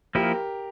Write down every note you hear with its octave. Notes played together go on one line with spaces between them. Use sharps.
F3 A#3 E4 G4 A#4